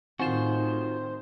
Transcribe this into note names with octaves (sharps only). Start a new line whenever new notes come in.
A2 D#3 C4 F4 F#4 C5 E7